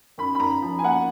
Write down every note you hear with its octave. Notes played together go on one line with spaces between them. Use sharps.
F#2 B5
B5
F#2 A#5
F3
G#5
A#3 F#5